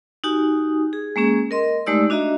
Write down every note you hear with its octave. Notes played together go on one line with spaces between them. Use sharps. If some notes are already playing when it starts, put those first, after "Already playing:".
D#4 F#4 G4 G#5 D#6
G#4
G#3 A#3 C#4 G#4
A#4 D#5 C6
G#3 A3 D#4 G4 D5 E6
D4 F#4 D#5 E5 A#5